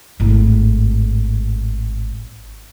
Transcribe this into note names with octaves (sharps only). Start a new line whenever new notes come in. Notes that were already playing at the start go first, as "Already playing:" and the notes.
G#1 A2